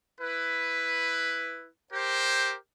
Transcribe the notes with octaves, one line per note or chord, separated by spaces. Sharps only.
E4 B4
G4 A#4 C5